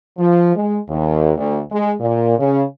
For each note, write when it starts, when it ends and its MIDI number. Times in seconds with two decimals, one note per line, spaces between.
0.18 0.55 53
0.56 0.78 56
0.89 1.32 39
1.37 1.59 38
1.72 1.93 56
2.00 2.36 46
2.39 2.63 49